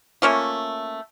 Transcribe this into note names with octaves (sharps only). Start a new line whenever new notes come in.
A3 A#3 C#4 F4